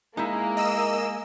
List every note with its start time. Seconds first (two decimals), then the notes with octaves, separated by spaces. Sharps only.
0.17 G#3 A#3 D#4 E4
0.57 D#5 E6 E7